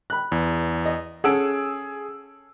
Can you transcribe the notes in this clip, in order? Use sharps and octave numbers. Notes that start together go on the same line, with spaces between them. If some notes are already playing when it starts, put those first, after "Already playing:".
B5 F#6
E2
D#5
C#4 G#4 A4 F#5 E6 D7